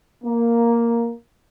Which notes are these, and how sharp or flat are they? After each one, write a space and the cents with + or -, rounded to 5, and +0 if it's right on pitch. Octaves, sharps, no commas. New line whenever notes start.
A#3 +0